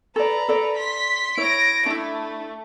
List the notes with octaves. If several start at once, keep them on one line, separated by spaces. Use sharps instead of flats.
A4 B4 D5 A#5
A4 D5
C6 B6
E4 C#5 A#6 D7
A3 D4 E4